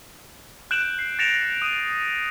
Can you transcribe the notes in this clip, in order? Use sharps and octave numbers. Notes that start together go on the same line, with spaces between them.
F#6 G6 D7 E7 F#7
C7
A6 A#6 C#7 D7 E7 F7
D#6 D#7 E7